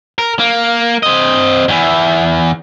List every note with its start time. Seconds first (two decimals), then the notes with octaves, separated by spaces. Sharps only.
0.18 A#4
0.39 A#3
1.03 C4 D#5
1.69 E2 E3